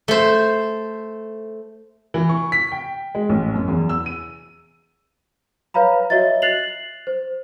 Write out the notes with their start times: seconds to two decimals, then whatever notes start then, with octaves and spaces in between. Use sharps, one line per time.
0.08 A3 C5
2.14 E3
2.29 C#6
2.52 B6
2.72 G5
3.15 G#3
3.29 A1
3.54 F#2
3.68 E2
3.89 E6
4.06 D#7
5.74 B4 C#5 F5 A#5 B5
6.10 F#4 C#5 D#5 E5 A6
6.42 F#6 A6 C7 F7 F#7
7.07 C5